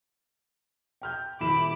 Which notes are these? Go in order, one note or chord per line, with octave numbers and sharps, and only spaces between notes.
G5 F6 G6
D#1 E4 B5 D6 E7